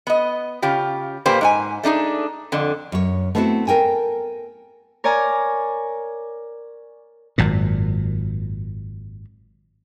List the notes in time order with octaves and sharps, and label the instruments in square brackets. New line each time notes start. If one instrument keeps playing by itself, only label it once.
[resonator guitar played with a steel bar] B3 D#5
C#3 F4 G4
A#2 A#3 G4 B4 C5
G#2 A4 G#5
A3 D4 D#4 G#4
F2 D3
[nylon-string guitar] F#2 C#5
A3 B3 C4 D4 E4 F#4
A4 A#4 G5 G#5
[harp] A#4 C#5 D5 G#5 A#5
[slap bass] G#1 F#2 A#2